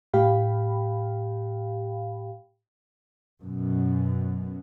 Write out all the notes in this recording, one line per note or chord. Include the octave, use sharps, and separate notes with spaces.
A2 G4 F5 G5 B5
F#2 B2